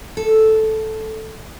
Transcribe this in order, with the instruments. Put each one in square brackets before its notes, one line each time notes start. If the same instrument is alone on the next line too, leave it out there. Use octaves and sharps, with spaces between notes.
[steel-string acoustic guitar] A4